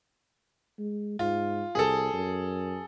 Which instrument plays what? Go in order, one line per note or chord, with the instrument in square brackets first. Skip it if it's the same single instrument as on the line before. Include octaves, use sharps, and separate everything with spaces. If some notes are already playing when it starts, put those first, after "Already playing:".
[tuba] G#3
[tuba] G#2 [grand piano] F4
[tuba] C2 [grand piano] G#4 A4
[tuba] F#2